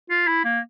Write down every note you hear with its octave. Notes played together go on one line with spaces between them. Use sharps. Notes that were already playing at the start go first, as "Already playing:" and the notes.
F4
E4
A#3